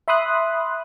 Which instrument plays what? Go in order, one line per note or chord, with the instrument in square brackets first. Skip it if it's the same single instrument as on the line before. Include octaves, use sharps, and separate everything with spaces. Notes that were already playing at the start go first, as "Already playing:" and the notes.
[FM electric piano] E5 B5 C6 D#6 F#6